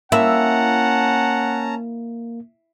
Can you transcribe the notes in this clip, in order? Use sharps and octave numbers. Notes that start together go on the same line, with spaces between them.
A#3 C#4 E4 F#5 A5 A#5